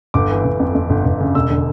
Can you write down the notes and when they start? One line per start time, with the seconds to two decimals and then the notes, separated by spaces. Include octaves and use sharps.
0.14 G1 D6
0.30 E3
0.45 G1
0.60 F2
0.75 F2
0.90 G1
1.05 G1
1.20 C#3
1.35 E1 E6
1.50 D3